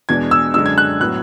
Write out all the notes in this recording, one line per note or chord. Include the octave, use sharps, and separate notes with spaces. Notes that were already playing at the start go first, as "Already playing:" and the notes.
E2 B2 G#3 D4 G#6
E6
F#2 D3 G#3 D4 E6
G#6
F#6
A2 F#3 B3 F#6